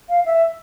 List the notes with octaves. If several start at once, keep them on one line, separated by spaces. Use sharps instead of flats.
F5
E5